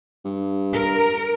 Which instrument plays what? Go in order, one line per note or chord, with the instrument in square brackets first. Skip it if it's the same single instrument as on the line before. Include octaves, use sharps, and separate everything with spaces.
[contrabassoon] G2
[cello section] A#4